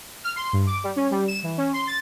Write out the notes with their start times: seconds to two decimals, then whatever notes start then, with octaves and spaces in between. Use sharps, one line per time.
0.24 F6
0.36 C6
0.53 G2
0.67 D6
0.84 G3
0.96 C#4
1.11 G3
1.28 E7
1.43 E3
1.57 C#4
1.73 C6
1.87 A6